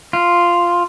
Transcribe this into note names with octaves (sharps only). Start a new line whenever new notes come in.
F4